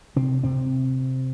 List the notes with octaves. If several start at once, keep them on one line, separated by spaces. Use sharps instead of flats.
C3 C4
C3 C4